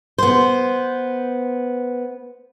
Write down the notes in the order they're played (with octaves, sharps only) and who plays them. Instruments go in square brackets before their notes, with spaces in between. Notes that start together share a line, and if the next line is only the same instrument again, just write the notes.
[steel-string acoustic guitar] B3 C5